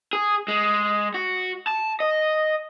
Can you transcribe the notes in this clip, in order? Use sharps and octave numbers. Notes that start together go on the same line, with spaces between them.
G#4
G#3
F#4
A5
D#5